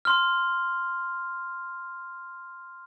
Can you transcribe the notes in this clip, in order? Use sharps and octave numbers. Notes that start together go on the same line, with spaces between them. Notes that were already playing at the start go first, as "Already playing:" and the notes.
C6 F6